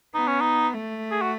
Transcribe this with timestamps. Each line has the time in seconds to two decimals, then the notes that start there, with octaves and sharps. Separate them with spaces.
0.15 B3 D#4
0.27 C#4
0.41 D#4
0.73 A3
1.12 G#4
1.22 F#4